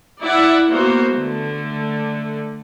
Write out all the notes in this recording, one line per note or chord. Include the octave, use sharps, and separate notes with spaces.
E4 D5 E5 F#5
A#3 B3 F#4 C5
D3 A3